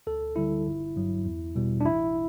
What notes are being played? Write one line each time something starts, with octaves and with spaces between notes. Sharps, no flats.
D2 A4
D3 G3 E4
G1
G2 F#3
E2
B2 G3
D4
A1 E4